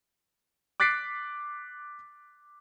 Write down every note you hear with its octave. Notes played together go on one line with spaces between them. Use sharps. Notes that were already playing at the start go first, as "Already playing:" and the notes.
D6 F#6 A6 B6 C7 D7